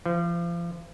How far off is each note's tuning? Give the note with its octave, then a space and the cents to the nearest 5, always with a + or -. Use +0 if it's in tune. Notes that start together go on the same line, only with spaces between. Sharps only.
F3 -35